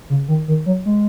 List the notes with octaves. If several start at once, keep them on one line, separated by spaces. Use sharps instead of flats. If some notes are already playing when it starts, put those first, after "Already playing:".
C#3
D#3
D#3
F#3
G#3